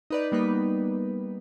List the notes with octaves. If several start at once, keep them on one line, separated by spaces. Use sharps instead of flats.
D#4 B4 D5
G3 A#3 B3 D#4 B4